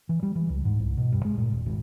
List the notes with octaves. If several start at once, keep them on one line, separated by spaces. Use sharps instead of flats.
E3
G3
E3
C#2
G#2
C2
B2
G2
G#3
A#2
D#1
G#1